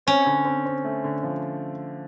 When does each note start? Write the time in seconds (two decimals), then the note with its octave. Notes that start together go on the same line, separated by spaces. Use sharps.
0.07 C4 C#4
0.26 D3
0.45 C4
0.66 C4
0.84 A3
1.04 D3
1.23 F3